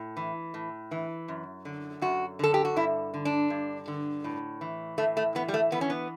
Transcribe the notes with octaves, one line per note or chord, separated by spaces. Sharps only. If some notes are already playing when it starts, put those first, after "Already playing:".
Already playing: A2
E3
A2
E3
F#2
D3
F#2 F#4
D3 A4
G4
F#4
G2 E4
D3
D4
G2
D3
A2
E3
A2 A3
A3
E3 B3
G3
A3
E3 B3
C#4
B3